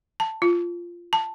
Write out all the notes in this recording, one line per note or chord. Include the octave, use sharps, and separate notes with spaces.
A5
F4
A5